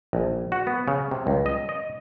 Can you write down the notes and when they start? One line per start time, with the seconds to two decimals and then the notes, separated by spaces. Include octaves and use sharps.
0.13 A#1
0.52 F#4
0.67 B3
0.88 C#3
1.11 C3
1.27 C#2
1.46 D#5
1.69 D#5